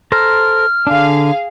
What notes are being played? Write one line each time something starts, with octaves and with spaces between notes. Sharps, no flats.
A4 C5 A#5 F6
D3 D4 G#4 F5